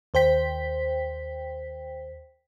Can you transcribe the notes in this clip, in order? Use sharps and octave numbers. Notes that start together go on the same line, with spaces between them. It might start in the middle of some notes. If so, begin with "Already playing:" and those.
D#2 C5 G5 B6